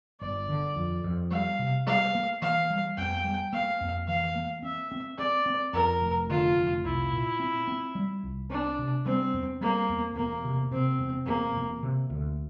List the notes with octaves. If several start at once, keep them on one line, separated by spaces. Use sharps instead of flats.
G1 D5
D3
F2
F2
G3 F5
C3
G3 F5
A#3
E3 F5
G3
F2 G5
G3
A#3 F5
F2
E3 F5
A#3
C4 E5
C4
C4 D5
C4
F2 A#4
F1
D3 F4
F1
C2 E4
A#2
C4
C4
G3
C2
C4 D4
C3
G3 C4
E2
G3 A#3
E2
E1 A#3
C3
C3 C4
E1
E1 A#3
E1
C3
D2